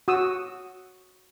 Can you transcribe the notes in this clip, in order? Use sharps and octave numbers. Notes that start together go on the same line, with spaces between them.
F#4 D#6 E6